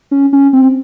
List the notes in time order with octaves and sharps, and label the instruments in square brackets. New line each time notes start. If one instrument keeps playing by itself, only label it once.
[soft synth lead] C#4
C#4
C4